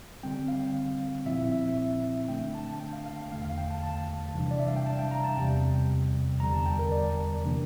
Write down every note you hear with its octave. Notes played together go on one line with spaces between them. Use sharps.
D3 G3 C4 G5
F5
A#2 F3 C4 E4 E5
E5
D3 A3 D4 G5
A5
G5
F5
F5
E2 D3 A3 F5
F5
G5
A5
A5
C3 E3 G3 D4
D5
E5
F5
G5
A5
G5
A#5
A5
E2 C3 G3 G5
E2 D3 G3 A#5
A5
G5
A#4
D5
C3 E3 A#3 D4